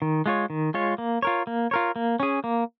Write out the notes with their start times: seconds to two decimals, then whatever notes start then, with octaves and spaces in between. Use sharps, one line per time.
0.02 D#3
0.26 G#3 F4 C#5
0.50 D#3
0.74 G#3 F4 C#5
0.98 A#3
1.22 F4 A#4 C#5
1.47 A#3
1.71 F4 A#4 C#5
1.96 A#3
2.20 C#4 G#4
2.44 A#3